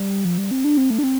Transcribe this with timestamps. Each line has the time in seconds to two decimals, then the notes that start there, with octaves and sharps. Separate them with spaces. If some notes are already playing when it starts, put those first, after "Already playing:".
Already playing: G3
0.25 F3
0.38 G3
0.51 C4
0.64 D4
0.77 C4
0.90 A3
0.99 D4
1.03 C4